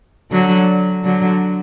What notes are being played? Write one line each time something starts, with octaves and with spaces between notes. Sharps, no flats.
D3 F#3
D3 F#3